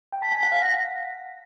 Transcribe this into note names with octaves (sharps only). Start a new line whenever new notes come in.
G5
A5 B6
G#5
F#5
F5
F#5 A#6